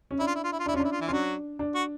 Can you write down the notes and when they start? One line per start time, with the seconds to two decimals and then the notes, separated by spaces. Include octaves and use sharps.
0.11 C#4
0.19 D4 E4
0.27 F4
0.35 E4
0.44 F4
0.52 E4
0.59 F4
0.66 D4 E4
0.74 C#4 F4
0.80 D4 E4
0.92 F4
1.01 E3 E4
1.08 C#4 F4
1.12 F#3 D4 F#4
1.59 D4
1.75 F#4